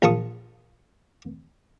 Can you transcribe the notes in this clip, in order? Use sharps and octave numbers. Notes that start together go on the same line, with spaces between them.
A#1 F4 A5 C#6 D#6